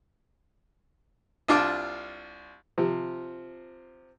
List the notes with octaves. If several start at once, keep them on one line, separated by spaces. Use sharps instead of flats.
C2 D4 F4 A5 D6
C3 F3